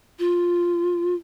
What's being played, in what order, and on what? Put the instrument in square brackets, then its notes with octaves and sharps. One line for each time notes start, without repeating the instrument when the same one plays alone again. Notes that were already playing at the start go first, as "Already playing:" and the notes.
[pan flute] F4